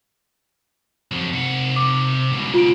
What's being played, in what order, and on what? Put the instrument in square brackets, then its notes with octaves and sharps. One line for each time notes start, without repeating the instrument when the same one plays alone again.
[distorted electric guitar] F2 F#3
C3 F#5
[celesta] D6
[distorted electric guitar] C#2 B2
[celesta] F4 D7